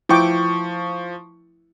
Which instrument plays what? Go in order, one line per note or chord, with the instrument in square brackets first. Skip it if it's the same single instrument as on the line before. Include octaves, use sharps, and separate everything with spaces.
[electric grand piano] F3 C#6 [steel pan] E4 G5 D6